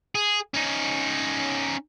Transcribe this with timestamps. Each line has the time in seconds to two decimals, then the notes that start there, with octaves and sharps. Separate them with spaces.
0.15 G#4
0.54 C#4 D#4